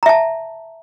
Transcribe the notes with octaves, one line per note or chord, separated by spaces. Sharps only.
E5 A5 A#5